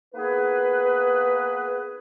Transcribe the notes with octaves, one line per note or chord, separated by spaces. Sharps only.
A#3 B3 D#4 G#4 B4